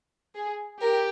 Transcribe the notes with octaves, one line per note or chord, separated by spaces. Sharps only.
G#4
G4 A#4